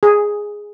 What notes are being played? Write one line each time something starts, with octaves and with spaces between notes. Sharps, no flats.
G#4